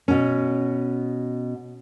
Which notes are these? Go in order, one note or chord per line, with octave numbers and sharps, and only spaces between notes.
B2 C#4